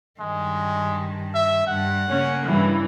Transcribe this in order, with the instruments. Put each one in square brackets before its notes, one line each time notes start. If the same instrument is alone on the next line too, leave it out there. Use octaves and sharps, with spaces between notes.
[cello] G2 D#3 [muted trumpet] G#3
[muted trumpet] E5
[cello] G2 [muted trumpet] F#5
[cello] C#3 A#3 [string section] C#4
[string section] G2 E3